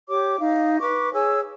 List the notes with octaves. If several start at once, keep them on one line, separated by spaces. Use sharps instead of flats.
G4 C#5 D6
D#4 F5
B4 C#6 D6
G#4 C#5 G#5 E6